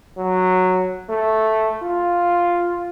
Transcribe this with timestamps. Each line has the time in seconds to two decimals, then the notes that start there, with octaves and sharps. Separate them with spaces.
0.17 F#3
1.10 A3
1.82 F4